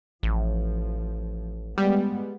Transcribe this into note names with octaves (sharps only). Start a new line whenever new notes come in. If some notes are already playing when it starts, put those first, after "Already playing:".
A1 F3
G3 G#3 B3